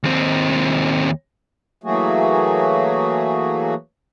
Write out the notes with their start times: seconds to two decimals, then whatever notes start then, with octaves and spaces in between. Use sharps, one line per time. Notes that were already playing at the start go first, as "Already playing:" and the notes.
0.03 D#2 C4
1.84 E3 F#3 A3 A#3 F#4 G#4